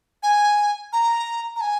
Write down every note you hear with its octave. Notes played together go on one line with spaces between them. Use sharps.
G#5
A#5
A#5
G#5